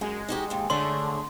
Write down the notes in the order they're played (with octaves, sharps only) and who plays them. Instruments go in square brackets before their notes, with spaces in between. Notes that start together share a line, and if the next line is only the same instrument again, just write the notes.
[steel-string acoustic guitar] F#2 [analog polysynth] G#3
[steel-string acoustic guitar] D#4 F#4 G4
D#2 G#2
[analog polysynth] D3 A3 [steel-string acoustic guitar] D4 G#4 C#5 [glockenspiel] C6